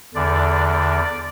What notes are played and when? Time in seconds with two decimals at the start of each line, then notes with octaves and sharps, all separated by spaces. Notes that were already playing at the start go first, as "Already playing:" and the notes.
0.14 E2 D3 D5
0.68 D5